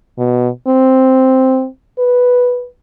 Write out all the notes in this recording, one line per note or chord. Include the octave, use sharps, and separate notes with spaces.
B2
C4
B4